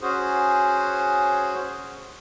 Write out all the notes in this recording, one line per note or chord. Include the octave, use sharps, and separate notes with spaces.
C#4 F#4 G#4 C5